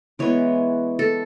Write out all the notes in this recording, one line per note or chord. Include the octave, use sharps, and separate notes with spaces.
E3 G#3 B3 C#5
A4